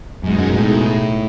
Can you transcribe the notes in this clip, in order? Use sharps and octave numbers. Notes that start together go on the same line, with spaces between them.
F#2 B2 G#3 D#4 G#4
F#2
A2